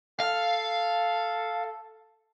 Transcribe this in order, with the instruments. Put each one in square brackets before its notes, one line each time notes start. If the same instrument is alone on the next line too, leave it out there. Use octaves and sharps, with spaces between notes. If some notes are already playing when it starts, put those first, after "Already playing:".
[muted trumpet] A4 [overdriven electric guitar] F5